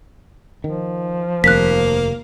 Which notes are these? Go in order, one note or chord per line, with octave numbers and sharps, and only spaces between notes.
D#3 F3
F1 D#2 A#3 F#6 B6